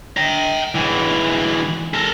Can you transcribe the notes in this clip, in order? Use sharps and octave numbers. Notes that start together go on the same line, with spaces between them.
G5 A#5
G#2 E3
A4 A#4